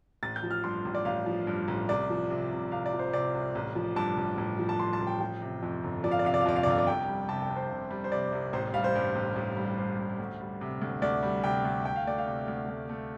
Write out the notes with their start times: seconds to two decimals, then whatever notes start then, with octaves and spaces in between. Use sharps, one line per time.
0.23 A1 A6
0.36 G6
0.43 F3
0.51 F6
0.64 G2 C6
0.85 A1
0.95 D5
1.05 A1 F5
1.26 F3
1.47 G2
1.68 A1
1.89 C2 D5
2.10 F3
2.30 C3
2.51 C2
2.72 C2 F5
2.86 D5
2.93 F3
2.99 C5
3.13 C3 D5
3.34 C2
3.55 A1
3.75 F3
3.96 G2 A5
4.17 A1
4.38 A1
4.58 F3
4.69 A5
4.79 G2 C6
4.93 A5
5.00 A1
5.07 G5
5.20 F3 G5
5.42 C3
5.63 F2
5.83 G1
6.04 F3 D5
6.11 F5
6.19 D5
6.25 C3 F5
6.34 D5
6.41 F5
6.46 F2 D5
6.56 F5
6.63 D5
6.66 G1 F5
6.78 D5
6.87 C2 G5
7.08 G3
7.29 C3 A5
7.42 G5
7.49 C2
7.56 C5
7.70 C2
7.90 G3
8.04 C5
8.12 C3 D5
8.32 C2
8.53 A1 C5
8.74 G3 F5
8.84 C5
8.95 G2
9.15 A1
9.36 A1
9.57 G3
9.78 G2 C5
9.98 A1
10.19 D2
10.40 G3
10.61 C3
10.81 D2
11.02 D2 D5
11.23 G3
11.44 C3 G5
11.65 D2
11.85 D2 G5
11.96 F5
12.06 A3 D5
12.18 F5
12.27 C3
12.48 D2
12.68 D2
12.89 A3